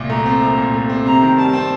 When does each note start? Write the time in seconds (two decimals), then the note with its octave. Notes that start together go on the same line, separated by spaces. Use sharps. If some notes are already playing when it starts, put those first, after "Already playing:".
Already playing: C2 A#2
0.09 A3 A#5
0.26 C4
0.41 C2
0.58 A#2
0.74 A3
0.89 C4
1.06 C3 A#5
1.22 D#3
1.38 G3 A5
1.53 C4